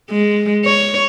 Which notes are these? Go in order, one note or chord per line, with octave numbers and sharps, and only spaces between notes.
G#3
C#5